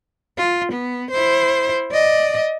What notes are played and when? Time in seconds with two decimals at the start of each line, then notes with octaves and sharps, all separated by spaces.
0.37 F4
0.72 B3
1.11 E4 C5
1.91 D5 D#5